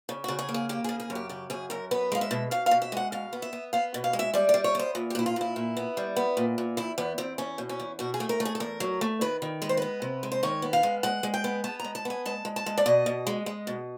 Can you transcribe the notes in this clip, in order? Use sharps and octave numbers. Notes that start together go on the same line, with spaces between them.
C#3
C#3 F#4
G#4
A#3
G#4
A#3 G4
C#3 G#4
G#4
F#2
G4
C#3 G4
F#2 G#4
F#2 A#4
B3 B4
G#3 F5
E5
B2
B2 F5
F5
B2
E5
G#3 F#5
B2 F5
B3
E5
B3
B3 F5
B2
F5
G#3
E5
G3 D5
D5
G3
C#5
B3 C5
A#2
G4
A#2 E4
F4
A#2 E4
A#2
B3
G3
B3
A#2
A#2
E2 E4
E2 B3
E2 C4
E2 C#4
B2
C#4
E2
B2 F#4
G#4
A3
A#4
A3
G#4
A4
E2 A#4
F#3
A3
D#3 B4
D#3
G#3 B4
C5
B3 B4
C3
G#3
C5
D#3 C#5
B3
F5
G#3
G#3 F#5
G#3
G5
B3
B3 A5
G#3 A#5
A5
B3 G#5
G#3 A5
G#3
A5
G#3
D5
B2 D#5
B2
G#3
G#3
B2